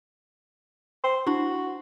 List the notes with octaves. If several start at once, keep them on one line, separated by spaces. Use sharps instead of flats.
C5
D4 E4 F#4